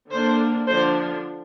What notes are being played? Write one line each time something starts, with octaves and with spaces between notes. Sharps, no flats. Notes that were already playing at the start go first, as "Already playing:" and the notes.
D3 A#3 D4 C5
D3 F3 D4 C5